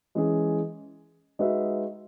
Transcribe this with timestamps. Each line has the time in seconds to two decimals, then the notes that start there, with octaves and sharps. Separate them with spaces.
0.15 E3 G#3 C#4 G#4
1.39 G#3 D#4 F#4 B4 E5